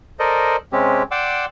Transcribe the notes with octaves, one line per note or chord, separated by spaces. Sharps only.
A4 A#4 C5 D5 D#5
C3 G#3 C4 C#4 G4
D5 F#5 G5 C6 D6 E6